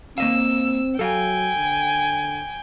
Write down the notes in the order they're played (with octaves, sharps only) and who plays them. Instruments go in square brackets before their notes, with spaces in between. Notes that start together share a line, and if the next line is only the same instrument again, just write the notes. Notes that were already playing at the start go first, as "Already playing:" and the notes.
[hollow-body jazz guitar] A#3 D#5 F5 [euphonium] C4 [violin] E6
[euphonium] F#3 [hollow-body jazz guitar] A4 F5 [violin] G5 G#5
[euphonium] D3